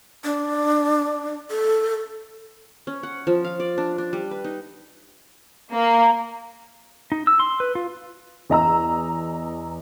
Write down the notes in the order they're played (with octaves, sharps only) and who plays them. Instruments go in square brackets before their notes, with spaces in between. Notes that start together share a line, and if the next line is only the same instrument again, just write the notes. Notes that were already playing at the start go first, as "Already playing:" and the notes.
[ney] D4
A4
[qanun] C#4
F#5
F3
F5
D5
D4
D4
G3
B4
D#4
[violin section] A#3
[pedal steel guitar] D#4
E6
C6
B4
F4
[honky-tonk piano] E2 D#5 A#5 E6